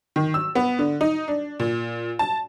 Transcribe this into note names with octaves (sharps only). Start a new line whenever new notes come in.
D#3
E6
B3
D3
D#4
D4
A#2
A5